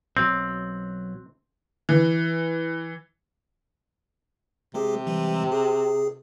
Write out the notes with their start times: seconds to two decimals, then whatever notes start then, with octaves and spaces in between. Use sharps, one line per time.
0.17 B1 F#3 C4
1.89 E3
4.74 C3 G#3 G4 G#4
5.07 E3 G3 G#3
5.52 G#4